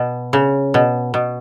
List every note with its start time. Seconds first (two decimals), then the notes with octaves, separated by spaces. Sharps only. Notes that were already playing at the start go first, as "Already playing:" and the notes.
Already playing: B2
0.33 C#3
0.74 B2
1.14 B2